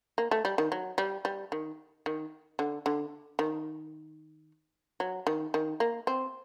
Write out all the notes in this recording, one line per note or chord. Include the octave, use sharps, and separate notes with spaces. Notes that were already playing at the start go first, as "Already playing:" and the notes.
A#3
A3
G3
D#3
F#3
G3
G3
D#3
D#3
D3
D3
D#3
F#3
D#3
D#3
A#3
C4